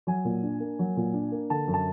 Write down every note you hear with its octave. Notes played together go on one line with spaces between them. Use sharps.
F#3 G#5
A#2
D4
A#3
F#3
A#2
D4
A#3
D3 A5
F#2
A5